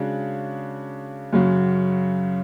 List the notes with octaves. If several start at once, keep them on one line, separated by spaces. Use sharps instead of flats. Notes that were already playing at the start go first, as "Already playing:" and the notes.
Already playing: C#3 G#3 D4 F#4
F#2 C#3 F#3